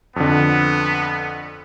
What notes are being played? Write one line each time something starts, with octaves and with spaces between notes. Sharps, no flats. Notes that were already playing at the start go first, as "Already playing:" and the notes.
F2 D3 B3